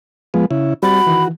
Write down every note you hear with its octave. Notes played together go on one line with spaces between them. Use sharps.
F3 G#3 B3
C#3 E4
G3 C4 F#4 B5 A6
D#3 E3